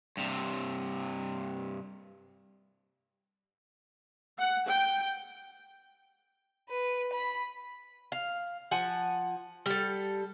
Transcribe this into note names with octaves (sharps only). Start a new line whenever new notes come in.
G2 C3
F#5
G5
B4
B5
F5
F3 F#5 G#5
G3 A4